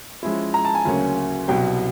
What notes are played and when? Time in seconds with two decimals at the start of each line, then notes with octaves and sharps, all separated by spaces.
0.23 F3 G#3 C#4 E4
0.54 A#5
0.65 A5
0.75 G#5
0.85 D2 C#3 F#3 A#3 C#4
1.48 C2 B2 F#3 G5